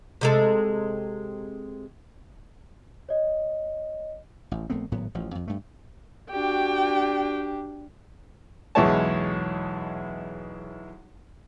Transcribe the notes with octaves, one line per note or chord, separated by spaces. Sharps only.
C3 G#3 A4
C#5 D#5
A1
A#1 A3 B3 C4
G#1 A2 F#3 B3
A1 F3
F2
G2 A3
D4 F#4 G4 G5
B1 E2 G#3 E4 C#5 A5